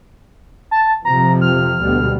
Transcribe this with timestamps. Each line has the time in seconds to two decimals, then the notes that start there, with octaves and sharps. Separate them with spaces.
0.71 A5
1.05 F2 C3 F3 A#5
1.41 F6
1.81 D2 B2 G3